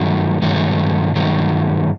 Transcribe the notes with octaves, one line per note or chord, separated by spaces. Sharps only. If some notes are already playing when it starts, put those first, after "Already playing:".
Already playing: G2 D#3 F#3 A3
G2 D#3 F#3 A3
G2 D#3 F#3 A3